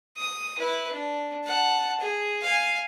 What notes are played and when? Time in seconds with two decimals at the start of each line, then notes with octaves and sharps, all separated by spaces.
0.17 D#6
0.58 E4 B4
0.92 D4
1.44 F#5 A5
2.00 G#4
2.42 F5 G#5